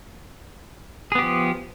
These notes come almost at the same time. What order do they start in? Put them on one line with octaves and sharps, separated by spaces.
G#4 B3 G4 F3